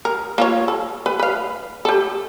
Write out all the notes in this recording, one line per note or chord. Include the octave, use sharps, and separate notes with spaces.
A#4
A#3 F4 C#5
A4
B4
B4 F5
G4 A4